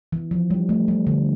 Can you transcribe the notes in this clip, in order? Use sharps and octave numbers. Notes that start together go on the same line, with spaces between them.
E3
F3
G3
A3
G3
D3